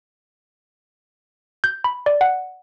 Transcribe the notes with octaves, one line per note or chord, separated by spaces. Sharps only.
G6
B5
D5
F#5